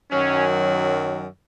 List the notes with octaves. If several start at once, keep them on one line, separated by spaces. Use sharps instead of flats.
F#2 D#3 F#3 C#4